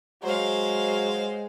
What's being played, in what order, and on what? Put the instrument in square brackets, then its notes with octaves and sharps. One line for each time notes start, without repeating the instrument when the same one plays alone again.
[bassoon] F#3 [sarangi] G#3 [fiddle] C5 F5